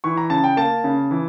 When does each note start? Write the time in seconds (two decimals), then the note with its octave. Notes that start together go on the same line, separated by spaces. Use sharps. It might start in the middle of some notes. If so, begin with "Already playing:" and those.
0.04 E3 C#6
0.17 A#5
0.30 C#3 A5
0.44 G5
0.57 A#3 A5
0.84 C#3
1.11 E3